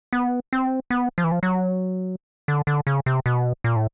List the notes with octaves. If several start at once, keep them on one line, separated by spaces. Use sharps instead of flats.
B3
C4
B3
F3
E3
F3
F#3
D3
D3
C#3
C3
B2
A#2
A2